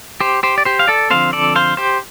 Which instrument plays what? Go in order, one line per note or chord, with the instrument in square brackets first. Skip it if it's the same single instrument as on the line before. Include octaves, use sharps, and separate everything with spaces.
[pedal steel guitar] G4 C5
G4 C5
D5
G4 C5
F5
A4 D5
D3 F3 A3 C4 C5 F5
A4 D5
C5 F5
G4 C5